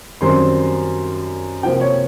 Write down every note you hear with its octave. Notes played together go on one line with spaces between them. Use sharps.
F#2 D#3 G3 C4 C6
C3 F3 A#3 G5
C#5